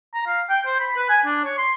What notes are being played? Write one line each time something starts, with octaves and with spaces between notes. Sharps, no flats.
A#5
F5
G5
C5
B5
B4
G#5
D4
C#5
C6